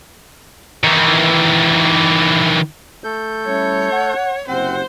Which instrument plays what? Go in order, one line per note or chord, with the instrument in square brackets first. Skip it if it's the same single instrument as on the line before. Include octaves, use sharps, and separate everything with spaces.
[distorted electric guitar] D#3 E3
[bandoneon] A3 A4 G6
[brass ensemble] G3 C#4 E4 [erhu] C#5
[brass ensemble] F#5
[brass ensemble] F#1 C3 F#5 [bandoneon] C4 [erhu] C5